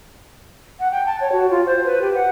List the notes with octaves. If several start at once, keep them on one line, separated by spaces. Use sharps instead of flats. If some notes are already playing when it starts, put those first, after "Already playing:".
F#5
G5
A5
C#5
F#4
F4
C5
B4
G4
F#5